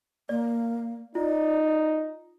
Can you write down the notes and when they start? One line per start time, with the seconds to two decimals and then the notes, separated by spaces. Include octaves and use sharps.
0.29 A#3 D5
1.15 D#4 F4 D5